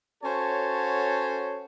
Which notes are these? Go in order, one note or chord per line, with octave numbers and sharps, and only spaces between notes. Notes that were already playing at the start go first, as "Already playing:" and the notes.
C#4 F#4 A4 C5 C#5 A5